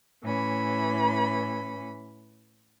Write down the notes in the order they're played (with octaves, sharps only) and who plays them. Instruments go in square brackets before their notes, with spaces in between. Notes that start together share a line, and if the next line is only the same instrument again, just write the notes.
[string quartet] A2 E3 C#4 B5